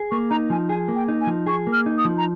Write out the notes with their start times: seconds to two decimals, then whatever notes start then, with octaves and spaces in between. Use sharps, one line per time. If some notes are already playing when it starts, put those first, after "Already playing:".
Already playing: G#4
0.11 A#3 C#6
0.30 D#4 A#5
0.50 F3 G#5
0.69 G#4 G#5
0.88 A#3
0.95 G5
1.08 D#4
1.21 G#5
1.27 F3
1.46 G#4 C#6
1.67 A#3
1.73 F6
1.86 D#4
1.98 D#6
2.05 F3
2.18 A#5